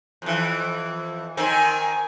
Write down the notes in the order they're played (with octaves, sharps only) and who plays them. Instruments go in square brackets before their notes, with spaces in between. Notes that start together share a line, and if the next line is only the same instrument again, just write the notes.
[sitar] F2 E3
[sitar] D#3 C4 [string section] G#5